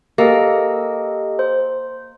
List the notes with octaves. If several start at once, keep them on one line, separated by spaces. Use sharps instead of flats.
A#3 G4 A4 D#5
C5